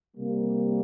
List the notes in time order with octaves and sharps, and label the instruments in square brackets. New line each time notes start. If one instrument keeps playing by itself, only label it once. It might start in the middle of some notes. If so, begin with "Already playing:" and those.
[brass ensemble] C3 G3 A#3